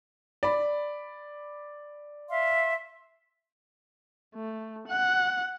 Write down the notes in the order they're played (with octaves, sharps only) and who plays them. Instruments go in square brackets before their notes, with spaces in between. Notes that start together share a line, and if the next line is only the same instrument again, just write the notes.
[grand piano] D5 B5
[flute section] E5 F5 C6
[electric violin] A3
F#5